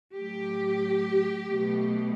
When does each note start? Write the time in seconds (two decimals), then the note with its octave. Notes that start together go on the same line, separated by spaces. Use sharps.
0.16 A2 F#3 A3 G4
1.48 B2 F#3 A3